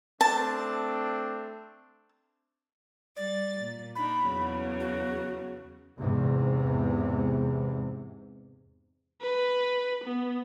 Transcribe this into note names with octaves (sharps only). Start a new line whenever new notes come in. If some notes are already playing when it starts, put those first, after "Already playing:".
A3 C4 D4 A5
G3 D5 A6
A#2
D4 D#4 B5
E2 C#3 F#3
F#4
E2 G#2 C3
B4
B3